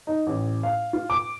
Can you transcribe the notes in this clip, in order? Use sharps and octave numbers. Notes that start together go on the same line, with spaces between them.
D#4
A1
F5
F4
D6